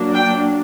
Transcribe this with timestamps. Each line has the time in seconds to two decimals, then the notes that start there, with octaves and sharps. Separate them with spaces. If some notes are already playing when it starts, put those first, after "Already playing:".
Already playing: F#3 A#3 D4
0.15 G5